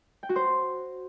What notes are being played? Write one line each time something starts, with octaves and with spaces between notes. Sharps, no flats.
G5
F#4
C5